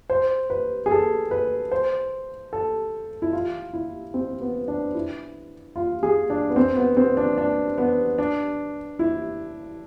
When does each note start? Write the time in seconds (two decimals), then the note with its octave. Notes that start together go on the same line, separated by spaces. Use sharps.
0.10 C5
0.50 B4
0.86 G#4
0.91 A4
1.31 B4
1.71 C5
2.53 A4
3.22 E4
3.33 F4
3.73 E4
4.14 C4
4.41 B3
4.68 D4
4.95 E4
5.76 F4
6.03 G#4
6.30 D4
6.50 B3
6.56 C4
6.76 B3
6.97 C4
7.17 D4
7.38 D4
7.78 B3
8.18 D4
8.99 E4